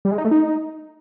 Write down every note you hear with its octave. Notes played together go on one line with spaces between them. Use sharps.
G3
G#3
D#4
A3
D#4